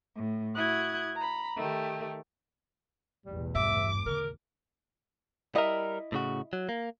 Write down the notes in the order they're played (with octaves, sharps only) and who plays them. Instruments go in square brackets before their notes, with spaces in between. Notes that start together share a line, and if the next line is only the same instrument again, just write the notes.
[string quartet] A2
E4 F#4 D#6 F#6 G#6
A#5 B5
D#3 A3 G4
[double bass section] A1 E2 B2 [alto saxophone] G3
[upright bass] G2 [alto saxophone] E5 [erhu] D6
[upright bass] D3 [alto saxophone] A#4
[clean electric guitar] G3 A#4 [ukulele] E4 D#5 E5
[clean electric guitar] A2 C#3 F#4
F#3
A#3